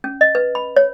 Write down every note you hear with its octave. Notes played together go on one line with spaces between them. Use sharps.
C#4
D#5
B4
B5
C#5